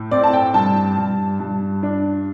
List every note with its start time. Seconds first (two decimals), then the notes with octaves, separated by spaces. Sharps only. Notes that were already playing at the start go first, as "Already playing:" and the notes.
Already playing: A2
0.11 C4 D5
0.23 A5
0.33 G5
0.54 G2 A5
0.97 G2
1.40 G2
1.83 D4